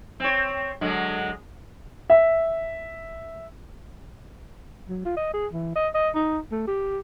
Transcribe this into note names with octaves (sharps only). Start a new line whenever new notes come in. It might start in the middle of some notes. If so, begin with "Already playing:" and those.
C4 C#5
D3 F#3 G#3
E5
F#3
F4
D#5
G#4
E3
D#5
D#5
D#4
A3
G4